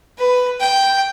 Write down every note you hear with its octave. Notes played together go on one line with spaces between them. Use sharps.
B4
G5